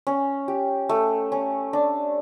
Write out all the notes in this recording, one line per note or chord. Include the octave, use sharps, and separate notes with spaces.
C#4
G4
A3
C#4
D4